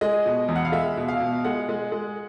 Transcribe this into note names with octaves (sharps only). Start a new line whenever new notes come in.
G#3 D#5
B2
E2
F#5
F5
G#3 E5
B2
F5
B2
G#3 F#5
G#3
G#3